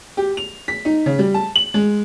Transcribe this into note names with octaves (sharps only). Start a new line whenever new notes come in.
G4
F7
B6
D#4
C#3
G3
A5
F#7
G#3